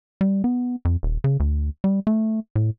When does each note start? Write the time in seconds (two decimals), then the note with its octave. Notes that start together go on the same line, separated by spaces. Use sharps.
0.21 G3
0.44 B3
0.85 F2
1.03 D#1
1.24 C#3
1.40 D2
1.84 G3
2.07 A3
2.56 A2